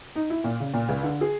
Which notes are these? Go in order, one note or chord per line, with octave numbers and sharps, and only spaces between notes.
D#4
E4
A#2
C#3
A#2
C#2
D3
G#4